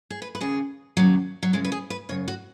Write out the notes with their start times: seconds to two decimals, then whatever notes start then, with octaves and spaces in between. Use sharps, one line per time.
0.10 G#4
0.22 B4
0.35 B4
0.41 D#2 C#3 G#4
0.97 D#2 C#3 F#3
1.43 F#3
1.53 F#2 C#3 G#3
1.65 B4
1.72 G#4
1.90 B4
2.09 F#2 C#3 C#5
2.28 F#4